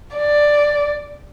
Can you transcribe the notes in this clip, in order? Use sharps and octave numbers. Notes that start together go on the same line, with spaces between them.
D5